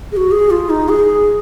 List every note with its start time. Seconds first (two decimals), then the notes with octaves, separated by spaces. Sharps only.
0.12 G#4
0.17 F#4
0.31 G#4
0.50 F4
0.70 D#4
0.89 G#4